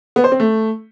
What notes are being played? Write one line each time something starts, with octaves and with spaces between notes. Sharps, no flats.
B3
C5
C4
A3